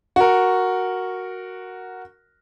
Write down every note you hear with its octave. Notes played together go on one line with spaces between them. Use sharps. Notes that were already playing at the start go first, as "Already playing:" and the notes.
F#4 A#4